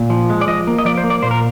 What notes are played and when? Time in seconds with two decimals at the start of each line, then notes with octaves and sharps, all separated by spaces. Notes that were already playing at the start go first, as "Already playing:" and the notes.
Already playing: A#2
0.10 F3
0.30 G#3
0.41 D5
0.47 F3 D#5
0.67 A#3
0.78 D#5
0.85 F3 D5
0.97 C5
1.04 A#3
1.10 D5
1.22 A#2 C5
1.31 A#4